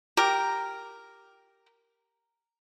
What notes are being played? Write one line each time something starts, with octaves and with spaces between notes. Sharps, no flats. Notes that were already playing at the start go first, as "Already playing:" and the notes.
G4 A#4